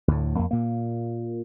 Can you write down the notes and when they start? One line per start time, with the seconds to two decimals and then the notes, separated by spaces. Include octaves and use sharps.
0.08 D2 A2
0.36 F2 A#3
0.51 A#2 A#3